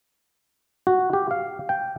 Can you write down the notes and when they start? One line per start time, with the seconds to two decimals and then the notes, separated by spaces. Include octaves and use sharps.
0.87 F#4
1.13 G4
1.31 F5
1.69 G5